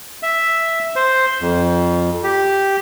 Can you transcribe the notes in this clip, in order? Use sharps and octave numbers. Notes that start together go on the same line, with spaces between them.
E5
C5
F2
G4